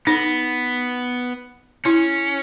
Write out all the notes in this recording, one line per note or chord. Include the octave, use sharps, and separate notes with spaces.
B3 D#4
C#4 E4